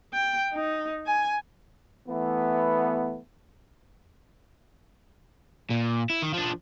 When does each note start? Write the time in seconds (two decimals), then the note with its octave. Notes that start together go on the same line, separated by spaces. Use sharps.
0.13 G5
0.54 D#4
1.06 G#5
2.08 E3 A3 B3
5.70 A#2
6.10 E4
6.22 D#3
6.34 F3 D4